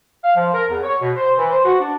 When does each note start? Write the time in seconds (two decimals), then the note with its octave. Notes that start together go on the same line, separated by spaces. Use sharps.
0.23 F5
0.36 F3
0.53 A#4
0.70 E2
0.83 C#5
1.01 B2
1.17 C5
1.37 E3
1.51 C5
1.65 F#4
1.80 D4